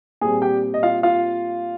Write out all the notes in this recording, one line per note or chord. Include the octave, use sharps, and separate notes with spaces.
A#2 G3 C4 G#4 G#5
G4 G5
D#5
F4 F5
F4 F5